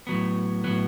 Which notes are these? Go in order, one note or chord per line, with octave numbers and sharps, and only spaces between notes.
A2 F#3 B3
A2 F#3 B3